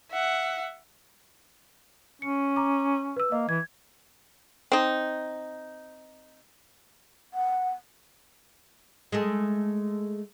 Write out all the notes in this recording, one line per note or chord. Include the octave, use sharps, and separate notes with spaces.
E5 F#5
C#4 C#7
A#5 D6
B4 E6
A#3 D#5
E3 G#6
C4 D#4
F#5
G#3 A3 G#4